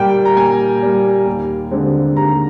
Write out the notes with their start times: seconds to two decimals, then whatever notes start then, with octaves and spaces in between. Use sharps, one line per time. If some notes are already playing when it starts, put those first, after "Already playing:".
Already playing: A#2 G3 A#3 G5
0.25 A#5
0.36 A#2 G#5
0.82 G3 A#3
1.26 D#2
1.71 D3 G#3 C4
2.17 D#2 A#5